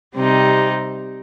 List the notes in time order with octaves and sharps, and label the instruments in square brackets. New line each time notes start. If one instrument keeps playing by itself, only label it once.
[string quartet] C3 G3 C4 D#4